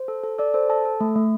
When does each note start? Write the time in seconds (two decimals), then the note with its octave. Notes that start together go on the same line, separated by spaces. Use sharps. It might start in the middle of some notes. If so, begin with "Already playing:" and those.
Already playing: C5
0.08 A4
0.23 A4
0.38 A4 D5
0.54 A4 C5
0.70 A4 A5
0.85 A4
1.01 A3
1.16 A3